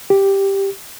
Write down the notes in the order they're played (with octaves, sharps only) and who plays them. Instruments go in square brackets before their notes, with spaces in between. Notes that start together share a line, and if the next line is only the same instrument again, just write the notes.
[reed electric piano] G4